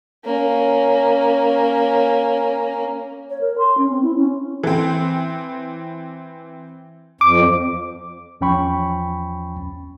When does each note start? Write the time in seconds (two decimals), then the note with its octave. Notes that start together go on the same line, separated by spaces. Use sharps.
0.24 A#3 C#4
3.30 C#5
3.41 A#4
3.58 C6
3.78 C#4
3.90 C4
4.03 E4
4.15 C#4
4.64 E3 C4
7.21 F2 D6
8.41 E2 F3 C#4 G5 B5 C#6